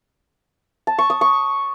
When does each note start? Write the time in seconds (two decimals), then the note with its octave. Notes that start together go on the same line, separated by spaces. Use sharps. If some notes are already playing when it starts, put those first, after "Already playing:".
0.87 A5
0.99 C#6
1.10 D#6
1.21 C#6